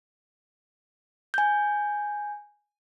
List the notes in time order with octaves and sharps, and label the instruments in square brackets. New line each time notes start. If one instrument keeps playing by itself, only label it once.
[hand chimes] G#5 G6